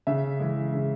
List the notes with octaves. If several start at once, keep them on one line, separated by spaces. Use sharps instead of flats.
C#3 E5
E3 G#3
C#3